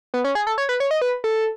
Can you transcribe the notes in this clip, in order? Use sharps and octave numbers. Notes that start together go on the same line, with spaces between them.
B3
C#4
G#4
A4
C#5
B4
C#5
D#5
B4
A4